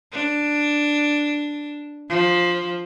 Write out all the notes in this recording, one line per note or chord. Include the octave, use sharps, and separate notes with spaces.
D4
F3